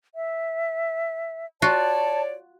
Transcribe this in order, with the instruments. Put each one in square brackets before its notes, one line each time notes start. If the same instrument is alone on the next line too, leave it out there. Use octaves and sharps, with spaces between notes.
[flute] E5
[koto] F4 F#4 [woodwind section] C#5 D5 [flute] A5